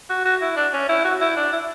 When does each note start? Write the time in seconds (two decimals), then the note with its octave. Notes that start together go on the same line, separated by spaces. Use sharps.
0.09 F#4
0.25 F#4
0.41 E4
0.56 D4
0.73 C#4
0.89 E4
1.04 F#4
1.21 E4
1.37 D4
1.53 E4